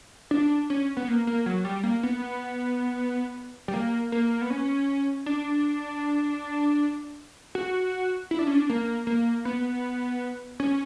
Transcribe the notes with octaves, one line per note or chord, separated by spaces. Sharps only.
D4
C#4
B3
A#3
A#3
F#3
G3
A#3
B3
G3
A#3
A#3
B3
C#4
D4
F#4
E4
D4
C#4
D4
A#3
A#3
B3
C#4